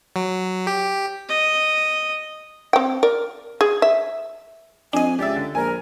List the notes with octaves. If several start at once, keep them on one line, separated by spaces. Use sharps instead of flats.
F#3
G4
D#5
C4 G5
A#4 D5
G#4
E5
F2 D4 D#5 G#5
C#2 G4 D5 E5
D3
A#1 A#4 G#5